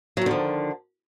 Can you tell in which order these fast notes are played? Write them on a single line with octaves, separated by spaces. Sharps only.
F#3 D#3 D3 F3